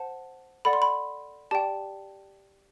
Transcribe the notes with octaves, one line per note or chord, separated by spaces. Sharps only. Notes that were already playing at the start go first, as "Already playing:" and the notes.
Already playing: C5 F#5 A5
A4 D5 F#5 B5
C6
B5
G4 D5 G5 A5